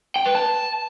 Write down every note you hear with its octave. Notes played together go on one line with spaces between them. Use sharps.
G5
B4
A5